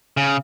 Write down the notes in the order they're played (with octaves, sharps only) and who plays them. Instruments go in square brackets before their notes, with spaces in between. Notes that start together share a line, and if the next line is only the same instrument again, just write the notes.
[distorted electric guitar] C#3